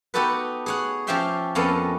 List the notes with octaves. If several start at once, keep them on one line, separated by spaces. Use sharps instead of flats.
B3 D#4 F#4 G4 A4 B4
G#4 C#5 F#5
F3 C#4 G4 E5 G5 C6
F2 A#3 B3 C#4 A4 D#5